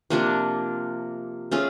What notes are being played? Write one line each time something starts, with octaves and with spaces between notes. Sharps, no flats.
C3 F3 A#3 D4
A3 C#4 F4 G#4